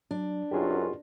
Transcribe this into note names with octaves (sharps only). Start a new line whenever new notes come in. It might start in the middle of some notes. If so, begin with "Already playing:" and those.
F#3 D4
C2 F#2 B2 F4 G4 G#4